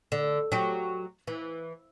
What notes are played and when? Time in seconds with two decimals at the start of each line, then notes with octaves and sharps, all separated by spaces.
0.12 D3
0.52 F#3 G4
1.27 E3